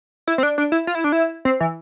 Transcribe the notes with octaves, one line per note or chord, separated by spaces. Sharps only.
E4
C4
D4
D4
E4
F4
E4
D4
E4
C4
E3